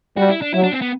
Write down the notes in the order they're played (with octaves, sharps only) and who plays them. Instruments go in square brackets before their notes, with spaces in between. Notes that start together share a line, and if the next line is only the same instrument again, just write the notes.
[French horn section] G3 [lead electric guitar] F#4
[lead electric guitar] E4
D4
[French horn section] F#3 [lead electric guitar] E4
[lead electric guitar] D4
C4
B3